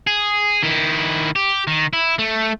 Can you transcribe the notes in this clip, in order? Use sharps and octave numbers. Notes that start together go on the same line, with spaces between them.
G#4
D#3 E4
G4
D#3
E4
A3